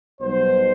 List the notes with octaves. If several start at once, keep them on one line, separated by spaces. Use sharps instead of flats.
B1 B2 G3 C5